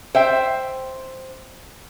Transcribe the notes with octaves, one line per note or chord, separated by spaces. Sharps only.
C5 E5 G5